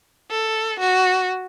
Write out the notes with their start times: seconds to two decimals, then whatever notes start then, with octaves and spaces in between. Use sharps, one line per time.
0.30 A4
0.79 F#4